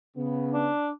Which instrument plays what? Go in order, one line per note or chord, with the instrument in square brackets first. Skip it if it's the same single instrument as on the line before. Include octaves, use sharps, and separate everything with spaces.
[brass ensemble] C#3 B3
[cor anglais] D4